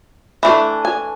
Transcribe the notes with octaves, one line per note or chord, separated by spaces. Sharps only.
E3 A3 D4
G#5